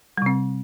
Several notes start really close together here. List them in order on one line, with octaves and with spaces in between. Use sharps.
G3 C3 C4